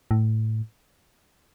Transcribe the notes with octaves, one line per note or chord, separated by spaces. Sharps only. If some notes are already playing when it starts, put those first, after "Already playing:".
A2